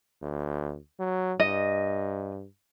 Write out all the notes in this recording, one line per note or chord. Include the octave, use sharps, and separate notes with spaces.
D2
F#3
G2 D#5